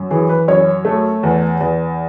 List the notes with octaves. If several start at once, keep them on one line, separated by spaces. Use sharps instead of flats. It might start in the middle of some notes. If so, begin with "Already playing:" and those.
Already playing: F#2
E3 G#4
B4
F#2 C#5
A3
E2
E2